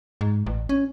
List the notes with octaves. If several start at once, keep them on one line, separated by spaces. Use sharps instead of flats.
G#2
A1
C#4